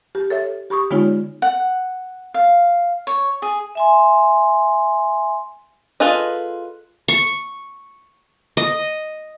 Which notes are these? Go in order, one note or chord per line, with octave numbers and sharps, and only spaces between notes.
G4
A4 C#5 E5
G4 B5 C#6 D#6
D3 G#3 B3 D#4 F4 C#5
F#5
F5
C#5
G#4
E5 G#5 C6
F4 G#4 A4 B4 D#5
C#6
D#5